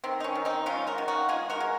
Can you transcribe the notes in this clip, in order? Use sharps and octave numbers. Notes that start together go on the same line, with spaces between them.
D#3 C4
D#4
C#4
D#3
C4 D#4
G#3 C#4 F4
F#4 A#4
D#3
D#4 F#4
G#3 F4 G#4
F#4 A#4
G#3